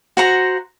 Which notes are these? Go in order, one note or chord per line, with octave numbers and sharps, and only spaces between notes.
F#4 C5 F#5 A#5